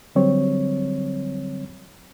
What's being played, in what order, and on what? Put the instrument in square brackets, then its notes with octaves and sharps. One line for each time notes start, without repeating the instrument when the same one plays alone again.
[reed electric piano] D3 F#3 G3 C4 C#5